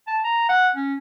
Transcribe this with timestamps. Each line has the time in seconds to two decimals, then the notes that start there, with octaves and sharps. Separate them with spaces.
0.07 A5
0.24 A#5
0.49 F#5
0.76 C#4